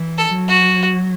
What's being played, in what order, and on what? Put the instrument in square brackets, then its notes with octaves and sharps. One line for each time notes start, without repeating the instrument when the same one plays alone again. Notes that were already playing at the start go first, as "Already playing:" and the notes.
Already playing: [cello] E3
[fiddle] A4
[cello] F#3
[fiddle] F#4